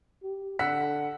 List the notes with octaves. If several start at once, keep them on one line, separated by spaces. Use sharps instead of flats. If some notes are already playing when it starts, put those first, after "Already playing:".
G4
D3 F#5 E6 B6